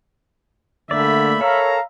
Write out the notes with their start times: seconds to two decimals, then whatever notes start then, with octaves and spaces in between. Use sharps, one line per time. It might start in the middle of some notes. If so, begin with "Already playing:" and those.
0.91 D3 A3 A#3 D5 E5 B5
1.41 A4 A#4 C#5 F5 A#5